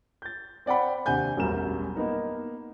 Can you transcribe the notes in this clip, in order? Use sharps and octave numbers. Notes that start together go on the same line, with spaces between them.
G6 A6
C4 D5 F#5 G5 B5
D#2 C3 D4 F#5 G#5 G6
E1 A1 F#2 G3 A#4 E7
A#3 B3 D#4 A#4